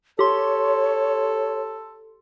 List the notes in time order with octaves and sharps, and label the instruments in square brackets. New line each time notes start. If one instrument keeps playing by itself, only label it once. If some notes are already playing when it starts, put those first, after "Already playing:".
[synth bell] G4 C6 [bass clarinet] A4 [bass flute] C#5